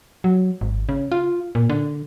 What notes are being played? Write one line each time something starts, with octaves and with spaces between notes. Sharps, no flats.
F#3
G#1
C#3
F4
A#2
D3